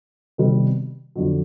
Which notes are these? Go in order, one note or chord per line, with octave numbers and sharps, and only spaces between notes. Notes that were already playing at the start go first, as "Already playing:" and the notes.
C3 D#3 G3 B3
F2 D3 F#3